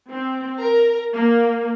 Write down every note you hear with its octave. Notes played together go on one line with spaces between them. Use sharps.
C4
A#4
A#3